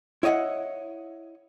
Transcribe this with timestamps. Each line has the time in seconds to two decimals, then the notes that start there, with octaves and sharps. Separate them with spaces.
0.23 E4 C#5 D#5 F5 F#5